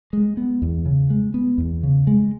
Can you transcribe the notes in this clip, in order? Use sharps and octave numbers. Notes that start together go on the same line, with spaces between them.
G#3
B3
E2
C#3
G#3
B3
E2
C#3
G#3